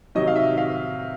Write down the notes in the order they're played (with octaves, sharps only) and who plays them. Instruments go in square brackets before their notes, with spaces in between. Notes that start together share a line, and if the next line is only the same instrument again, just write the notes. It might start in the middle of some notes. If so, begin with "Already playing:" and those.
[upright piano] C3 D#3 F#3 D#5
F5
E5
F5